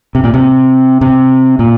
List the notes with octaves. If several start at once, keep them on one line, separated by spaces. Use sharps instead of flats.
C3
A#2
C3
C3
A#2